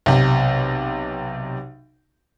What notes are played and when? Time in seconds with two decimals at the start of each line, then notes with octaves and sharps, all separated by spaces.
0.06 B1 C3